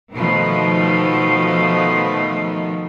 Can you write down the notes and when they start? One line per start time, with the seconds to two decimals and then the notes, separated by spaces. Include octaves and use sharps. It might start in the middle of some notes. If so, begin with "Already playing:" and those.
0.13 B2 D#3 F3 A3